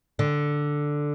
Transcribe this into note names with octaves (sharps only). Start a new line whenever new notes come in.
D3